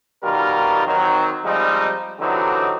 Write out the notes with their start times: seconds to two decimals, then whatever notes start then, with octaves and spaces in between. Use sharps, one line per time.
0.24 B2 D#3 G3 F4 A#4
0.87 D#3 F#3 C4
1.45 F3 G3 G#3 C4 D#4
2.20 D3 E3 F#3 G3 C4 D#4